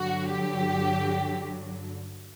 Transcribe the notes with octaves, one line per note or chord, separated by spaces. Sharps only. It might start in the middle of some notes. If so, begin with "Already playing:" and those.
Already playing: G2 D3 F#3 F#4
G4